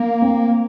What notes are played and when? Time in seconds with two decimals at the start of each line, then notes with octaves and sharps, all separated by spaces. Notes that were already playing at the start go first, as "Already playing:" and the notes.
Already playing: A#3
0.22 C4